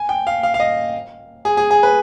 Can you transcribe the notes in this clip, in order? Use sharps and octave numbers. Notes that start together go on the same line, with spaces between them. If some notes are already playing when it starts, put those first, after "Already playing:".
Already playing: G#5
G5
F5
F5
F5
D#5
G#4
G#4
G#4
B4